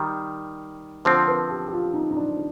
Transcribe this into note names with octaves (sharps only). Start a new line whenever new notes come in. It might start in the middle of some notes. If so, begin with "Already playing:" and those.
Already playing: D#3 G3
D3 F3 C4 C5
B4
G4
G4
F4
D#4
D#4
D4